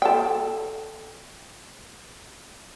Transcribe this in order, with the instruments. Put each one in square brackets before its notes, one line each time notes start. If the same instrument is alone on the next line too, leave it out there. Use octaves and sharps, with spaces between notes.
[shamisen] A4 G5